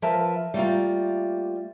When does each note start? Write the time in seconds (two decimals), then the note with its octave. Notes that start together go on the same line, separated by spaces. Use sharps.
0.02 F3 A#4 B4 E5 A5
0.54 G3 A3 A#3 F4